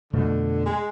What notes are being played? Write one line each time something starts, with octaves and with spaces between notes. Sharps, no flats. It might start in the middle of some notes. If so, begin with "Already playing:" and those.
F2 B2 D3 A3
G#3